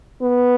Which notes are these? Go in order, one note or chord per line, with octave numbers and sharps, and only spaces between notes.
B3